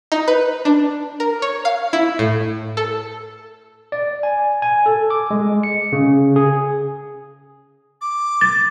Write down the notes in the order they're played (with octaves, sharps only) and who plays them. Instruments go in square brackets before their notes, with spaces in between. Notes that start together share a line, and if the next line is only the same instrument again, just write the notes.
[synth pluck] D#4
B4
D4
A#4
C#5
F5
E4
A2
A4
[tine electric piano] D5
G#5
G#5
A4
D6
G#3
C#7
C#3
G#4
[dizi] D6
[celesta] A6